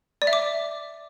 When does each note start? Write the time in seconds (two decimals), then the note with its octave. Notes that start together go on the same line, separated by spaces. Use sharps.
0.22 D5
0.27 E5
0.33 D6